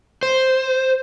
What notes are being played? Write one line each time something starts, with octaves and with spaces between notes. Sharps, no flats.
C5